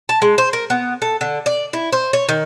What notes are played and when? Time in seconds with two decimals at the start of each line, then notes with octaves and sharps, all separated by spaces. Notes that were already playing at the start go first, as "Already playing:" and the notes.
0.09 A5
0.22 G#3
0.38 C5
0.53 A#4
0.70 B3
1.02 A4
1.21 D3
1.46 D5
1.73 E4
1.92 C5
2.13 C#5
2.29 D#3